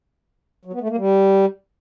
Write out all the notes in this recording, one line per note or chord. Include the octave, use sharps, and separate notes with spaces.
F#3
B3
A3
A#3
G3